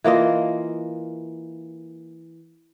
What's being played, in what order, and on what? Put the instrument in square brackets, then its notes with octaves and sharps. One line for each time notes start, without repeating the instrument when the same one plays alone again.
[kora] E3 A#3 F4 D#5